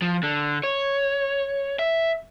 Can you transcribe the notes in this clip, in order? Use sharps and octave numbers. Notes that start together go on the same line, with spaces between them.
F3
D3
C#5
E5